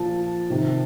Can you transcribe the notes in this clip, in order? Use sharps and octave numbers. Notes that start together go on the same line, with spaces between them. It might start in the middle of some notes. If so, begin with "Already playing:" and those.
Already playing: A#2 F3 A5
C3 D#3